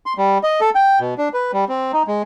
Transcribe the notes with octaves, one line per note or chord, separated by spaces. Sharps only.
C6
G3
D#5
A4
G5
B2
D4
B4
G3
C4
D#4
G#3